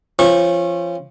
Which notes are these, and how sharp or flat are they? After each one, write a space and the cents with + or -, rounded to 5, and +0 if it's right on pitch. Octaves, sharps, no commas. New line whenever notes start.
F3 -20 C#4 -30 C#6 -25